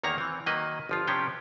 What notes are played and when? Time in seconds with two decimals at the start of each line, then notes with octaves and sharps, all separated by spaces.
0.03 E2 D#3 A#3 C#5 A#5
0.18 E3 C4
0.46 D#3 F#3 A#3 B4 D#5
0.89 G1 F3 F4
1.07 C3 F3 C#4 D4 G4 G5